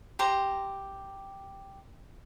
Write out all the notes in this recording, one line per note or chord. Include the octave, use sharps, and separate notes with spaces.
G4 C5 A#5